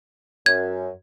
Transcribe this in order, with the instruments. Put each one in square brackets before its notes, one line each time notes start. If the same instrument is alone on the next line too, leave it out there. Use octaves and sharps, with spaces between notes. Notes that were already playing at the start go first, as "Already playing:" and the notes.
[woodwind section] F#2 [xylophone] G#6